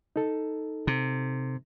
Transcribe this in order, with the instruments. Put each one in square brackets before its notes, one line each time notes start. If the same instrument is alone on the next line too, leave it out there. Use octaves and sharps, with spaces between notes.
[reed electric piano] D#4 A4
[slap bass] C3